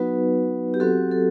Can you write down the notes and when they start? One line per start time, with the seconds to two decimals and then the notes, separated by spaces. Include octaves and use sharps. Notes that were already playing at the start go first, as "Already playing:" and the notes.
Already playing: F#3 B3 D#4 F#4 B4
0.74 G4
0.80 F#3 C4 F#4 A4
1.11 A4